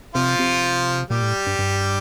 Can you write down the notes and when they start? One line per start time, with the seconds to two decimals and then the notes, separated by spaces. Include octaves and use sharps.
0.15 C3 F3 F4
0.39 C3
1.10 A#2 G3 G4
1.22 A2
1.47 G2
1.59 G2